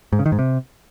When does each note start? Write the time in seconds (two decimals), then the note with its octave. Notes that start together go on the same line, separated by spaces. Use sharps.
0.13 G#2
0.19 C#3
0.26 D#3
0.32 G#2
0.39 C3